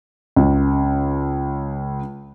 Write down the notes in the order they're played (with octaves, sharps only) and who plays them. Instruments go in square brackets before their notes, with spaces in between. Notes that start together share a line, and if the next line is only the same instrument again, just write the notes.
[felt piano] C#2 C#3